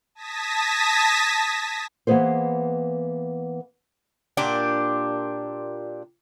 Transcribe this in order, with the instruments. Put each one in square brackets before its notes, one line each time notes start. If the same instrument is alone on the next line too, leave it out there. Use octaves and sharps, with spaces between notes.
[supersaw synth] A5 D#6 G#6 A#6 B6
[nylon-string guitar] E3 A#3 B3 G#4 B4 C5
[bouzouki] A#2 D4 G4